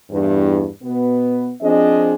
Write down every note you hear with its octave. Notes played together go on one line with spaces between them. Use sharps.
E2 G2
B2 B3
F3 C4 D4 G#4 D#5